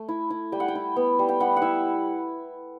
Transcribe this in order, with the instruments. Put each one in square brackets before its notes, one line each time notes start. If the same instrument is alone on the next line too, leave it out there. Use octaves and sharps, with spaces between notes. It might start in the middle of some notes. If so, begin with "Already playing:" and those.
Already playing: [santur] A3
E4
E4
G3 G5
F#5
G5
E4
B3
G3
G5
G3 F#5
F#5
E4 E5